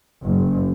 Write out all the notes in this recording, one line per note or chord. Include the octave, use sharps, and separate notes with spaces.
F#1